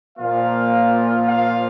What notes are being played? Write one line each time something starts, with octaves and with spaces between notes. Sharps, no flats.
A#2 F3 A#3 F4 F5
F5